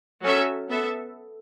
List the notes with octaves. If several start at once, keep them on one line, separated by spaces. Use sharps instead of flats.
F#3 C#4 A4 E5
B3 A4 E5